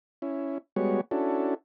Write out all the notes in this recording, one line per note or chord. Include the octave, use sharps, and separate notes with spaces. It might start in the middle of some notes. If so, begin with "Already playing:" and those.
C#4 E4
G3 G#3 B3 F#4 C#5
C#4 D4 E4 F#4 A4